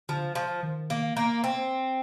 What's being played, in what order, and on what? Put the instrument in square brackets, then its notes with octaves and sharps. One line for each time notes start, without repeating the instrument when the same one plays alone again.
[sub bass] D3 [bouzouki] F3
[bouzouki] F3
[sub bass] D#3
[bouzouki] A#3
A#3
C4